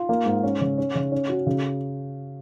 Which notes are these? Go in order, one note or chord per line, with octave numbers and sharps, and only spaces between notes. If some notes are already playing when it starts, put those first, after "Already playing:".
Already playing: F4
A#3
G#2
C#4
C#3
C#4
C#3
C#4
F#4
C#3